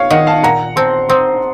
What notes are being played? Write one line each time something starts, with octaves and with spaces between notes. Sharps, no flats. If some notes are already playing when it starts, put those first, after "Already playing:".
Already playing: C#5 F5
D#3 D#5 F#5
F5 A5
A#2 F#5 A#5
C4 A5 C6
C4 C6 D#6